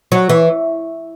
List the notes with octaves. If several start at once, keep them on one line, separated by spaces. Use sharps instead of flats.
F#3
E3